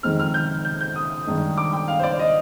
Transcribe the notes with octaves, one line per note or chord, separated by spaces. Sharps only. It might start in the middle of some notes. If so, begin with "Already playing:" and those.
F2 D#3 G#3 C4 D#4 F6
F6
G6
G6
G6
D#6
G2 D#3 G#3 D4
D6
G5
F5
C5
D5
D#5